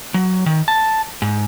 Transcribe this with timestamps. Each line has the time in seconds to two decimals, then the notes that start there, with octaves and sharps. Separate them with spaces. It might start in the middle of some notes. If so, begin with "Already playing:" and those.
0.14 F#3
0.46 D#3
0.68 A5
1.22 G#2